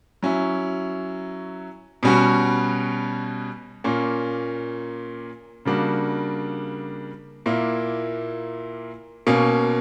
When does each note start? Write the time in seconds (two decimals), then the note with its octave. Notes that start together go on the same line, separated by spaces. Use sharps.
0.23 F#3 C#4 E4
2.03 B2 G3 C#4 F#4
3.84 A#2 A#3 C#4
5.65 C#3 G3 A#3 D4 F#4
7.46 A#2 A#3 E4
9.27 B2 A#3 C#4